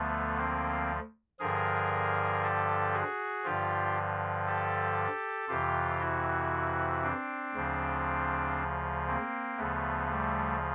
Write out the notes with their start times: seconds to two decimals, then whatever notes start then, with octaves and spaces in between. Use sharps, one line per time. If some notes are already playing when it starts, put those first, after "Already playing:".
Already playing: D2 D3 F3 A3 B3
0.37 A#3 C4
1.39 G2 D3 F3 G#4 A#4
2.42 G4 A4
2.93 F#4 G#4
3.44 G2 D3 F3 F4 G4
4.46 G4 A4
5.48 F2 C3 E3 F4 G4
6.00 E4 F#4
7.03 C4 D4
7.53 D2 C#3 F3
9.07 A#3 C4
9.57 D2 C#3 F3 A3 B3
10.09 G3 A3